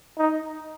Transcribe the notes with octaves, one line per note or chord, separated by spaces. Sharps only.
D#4